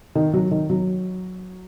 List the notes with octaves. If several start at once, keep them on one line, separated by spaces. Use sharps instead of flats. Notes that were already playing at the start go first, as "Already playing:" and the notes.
D#3
F#3
D#3
F#3